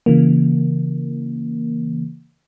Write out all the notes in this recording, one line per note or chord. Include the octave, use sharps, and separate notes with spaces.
C#3 E3 A#3